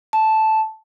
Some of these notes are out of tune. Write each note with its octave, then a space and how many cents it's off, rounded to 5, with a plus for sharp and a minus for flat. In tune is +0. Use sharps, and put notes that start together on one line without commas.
A5 -5